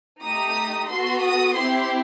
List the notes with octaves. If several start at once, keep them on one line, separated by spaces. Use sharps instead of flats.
A3 D#4 G4 D#6
B3 F#4 A4 C6
D#6
C4 E4 G4 C6